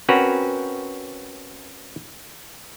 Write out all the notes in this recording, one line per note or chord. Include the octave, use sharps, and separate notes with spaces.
C4 C#4 F#4 A#4 B4